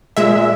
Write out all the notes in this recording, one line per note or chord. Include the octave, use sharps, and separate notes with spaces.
A#2 G#3 E5